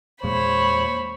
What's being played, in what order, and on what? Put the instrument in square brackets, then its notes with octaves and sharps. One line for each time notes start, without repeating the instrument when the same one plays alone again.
[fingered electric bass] E2 A#2 G#3 [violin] C5 [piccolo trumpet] C#5 [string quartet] B5